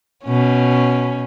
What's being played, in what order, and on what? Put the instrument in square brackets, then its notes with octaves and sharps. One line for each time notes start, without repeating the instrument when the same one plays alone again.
[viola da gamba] B2 C#4